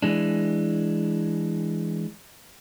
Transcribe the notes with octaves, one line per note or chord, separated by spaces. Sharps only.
E3 G#3 D4